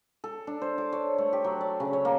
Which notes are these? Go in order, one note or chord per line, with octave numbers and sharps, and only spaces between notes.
A4
D4
C5
D6
C#5
A3
G4
F#3
D5
C#3
C#5
A#3